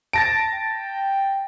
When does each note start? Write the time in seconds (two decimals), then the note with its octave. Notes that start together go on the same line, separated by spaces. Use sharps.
0.13 A5 A6 A#6 D7
0.53 G5